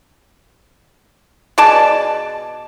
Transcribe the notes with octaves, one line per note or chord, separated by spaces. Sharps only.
B2 G#4 D5 A5